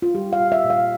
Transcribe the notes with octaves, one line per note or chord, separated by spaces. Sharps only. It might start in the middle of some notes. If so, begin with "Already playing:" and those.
F4
G3 G4
F5
A#2
E5
A#2
F5